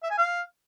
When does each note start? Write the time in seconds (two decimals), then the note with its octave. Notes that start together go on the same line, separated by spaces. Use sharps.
0.03 E5
0.11 G#5
0.18 F5